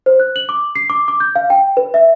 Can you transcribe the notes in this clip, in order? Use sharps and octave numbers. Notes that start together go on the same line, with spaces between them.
C5
F#6
F#7
D6
C7
D6
D6
G6
F5
G5
B4
E5